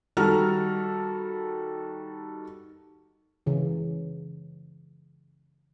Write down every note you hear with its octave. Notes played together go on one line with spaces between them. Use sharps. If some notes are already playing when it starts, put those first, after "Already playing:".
D#3 G3 F#4 A4 A#5 F6
C#3 E3